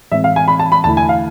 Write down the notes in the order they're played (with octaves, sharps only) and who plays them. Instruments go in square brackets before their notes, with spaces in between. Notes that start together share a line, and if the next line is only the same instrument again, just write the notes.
[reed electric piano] A2 E3 G#3 C4 [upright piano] E5
[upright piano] F5
G#5
B5
A5
B5
[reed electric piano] E2 D3 A3 E4 [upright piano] A5
[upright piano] G#5
F5